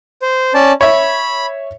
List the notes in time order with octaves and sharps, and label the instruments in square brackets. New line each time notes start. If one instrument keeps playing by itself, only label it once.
[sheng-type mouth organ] C5
C#4 D5 A5
[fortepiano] C#5 E5 [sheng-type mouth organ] B5